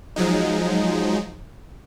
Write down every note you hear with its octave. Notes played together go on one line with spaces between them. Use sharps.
F3 F#3 G#3 D#4